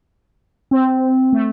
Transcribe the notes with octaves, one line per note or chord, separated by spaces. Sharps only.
C4
A3